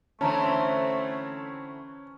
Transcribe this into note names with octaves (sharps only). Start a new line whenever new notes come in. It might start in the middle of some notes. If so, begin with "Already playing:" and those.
D3 E3 A3 C4 C#4 A5 A#5